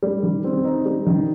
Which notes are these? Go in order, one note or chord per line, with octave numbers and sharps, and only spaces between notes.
G3
D#3
C4
D#4
G3
D#3